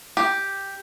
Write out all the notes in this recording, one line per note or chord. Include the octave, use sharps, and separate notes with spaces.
G4